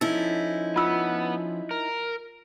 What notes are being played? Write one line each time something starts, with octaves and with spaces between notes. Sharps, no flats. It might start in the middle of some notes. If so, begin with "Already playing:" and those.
F3 C#4 D#4 E4 A4
B3 F4 E6
A#4